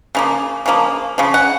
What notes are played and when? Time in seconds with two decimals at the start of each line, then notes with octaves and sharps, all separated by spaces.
0.15 C#3 F3 A#3
0.66 C#3 F3 A#3
1.18 C#3 F3
1.34 F#5